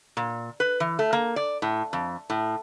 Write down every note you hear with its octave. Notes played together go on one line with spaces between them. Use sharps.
A#2
B4
E3
A3
A#3
D5
A2
F2
A2